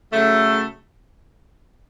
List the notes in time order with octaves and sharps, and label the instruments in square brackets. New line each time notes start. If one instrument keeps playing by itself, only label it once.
[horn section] C#3 F#3 A3